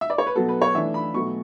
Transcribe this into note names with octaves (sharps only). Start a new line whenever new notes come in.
E5
D5
C#5
B4
B2 F#3 B3 A4
B4
C#5
E3 A3 D4 E5
B5
B2 F#3 A3 C#6